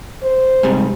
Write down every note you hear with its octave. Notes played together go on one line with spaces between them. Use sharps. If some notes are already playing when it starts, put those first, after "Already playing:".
C5
G#2 C3 G3